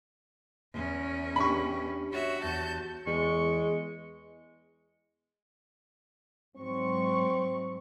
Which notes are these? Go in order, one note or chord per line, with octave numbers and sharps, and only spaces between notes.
E2 C#4
D4 G4 B5 C#6
F#4 C#5 E5
E2 A5 G6
E2 G#3 C#6
G#2 F#3 C4 C#6